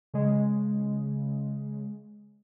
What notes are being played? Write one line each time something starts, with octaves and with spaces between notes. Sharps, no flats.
C#3 G#3